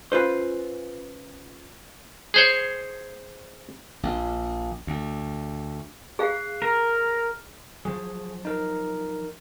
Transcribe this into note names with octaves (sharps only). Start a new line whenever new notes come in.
C#4 F4 B4 C5
G#4 C5 C#5
A#1
D2
G#4 F5 F#6 C7
A#4 A#5 F6
F3 F#3 G#4
D#4 A#4